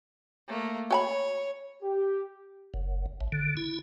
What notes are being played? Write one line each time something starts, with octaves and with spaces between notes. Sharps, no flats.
A3 A#3
F#4 C#5 G#5 B5
G4
F#1
A1
D3
E4